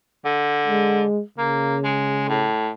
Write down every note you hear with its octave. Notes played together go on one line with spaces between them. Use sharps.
D3
G#3
C#3 A#3
G#3
A2